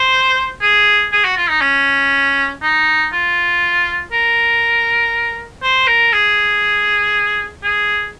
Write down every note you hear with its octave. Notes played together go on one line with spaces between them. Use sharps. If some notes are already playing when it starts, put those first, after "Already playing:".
Already playing: C5
G#4
G#4
F#4
F4
D#4
C#4
D#4
F4
A#4
C5
A#4
G#4
G#4